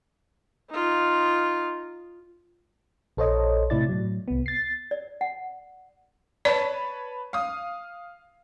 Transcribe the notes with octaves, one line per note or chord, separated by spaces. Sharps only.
D#4 F4
A#1 A4 C5 C#5 D#5
A2 C3 E4 D5 A6
A2 F#3
C2 B3
A6 C7
D5
F#5
B4 C#5 D5 A5
F5 D#6